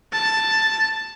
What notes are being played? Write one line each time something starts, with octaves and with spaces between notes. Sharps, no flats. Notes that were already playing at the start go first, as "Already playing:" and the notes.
A5